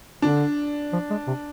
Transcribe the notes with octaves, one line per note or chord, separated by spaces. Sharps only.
D3 D4
F3
G#3
C3